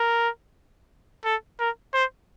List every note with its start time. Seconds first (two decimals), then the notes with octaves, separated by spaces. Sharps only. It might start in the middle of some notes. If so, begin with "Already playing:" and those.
Already playing: A#4
1.25 A4
1.59 A#4
1.94 C5